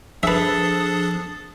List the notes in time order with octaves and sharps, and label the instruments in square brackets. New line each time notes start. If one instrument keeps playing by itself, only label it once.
[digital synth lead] F3 [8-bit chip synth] D4 G#4 D#6 [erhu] A4 [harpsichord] B4 E5